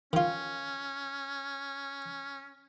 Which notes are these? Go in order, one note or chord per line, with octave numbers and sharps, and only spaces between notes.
D#3 C#4 F4